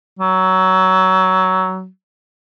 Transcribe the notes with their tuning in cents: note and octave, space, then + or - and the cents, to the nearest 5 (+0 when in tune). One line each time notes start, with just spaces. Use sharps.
F#3 +15